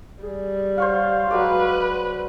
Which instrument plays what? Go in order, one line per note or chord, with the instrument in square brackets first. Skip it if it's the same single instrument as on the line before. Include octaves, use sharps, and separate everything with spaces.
[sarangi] G3 [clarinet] G#4
[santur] C5 C#5 F#5 [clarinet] F5
[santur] F#3 G#3 D5 [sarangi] B4